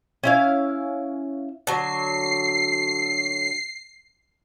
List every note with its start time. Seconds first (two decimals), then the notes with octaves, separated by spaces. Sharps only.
0.23 C#4 E4 F5
1.67 D3 F#3 C7